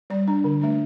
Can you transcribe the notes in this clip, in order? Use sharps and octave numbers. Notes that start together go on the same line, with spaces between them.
G3 D5
D4
D3
A3 D4